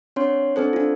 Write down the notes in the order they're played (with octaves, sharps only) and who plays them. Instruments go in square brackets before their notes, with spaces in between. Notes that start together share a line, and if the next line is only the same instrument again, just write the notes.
[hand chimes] C4 D4 C#5 C6
C4 D4 A4 C5
D4 F4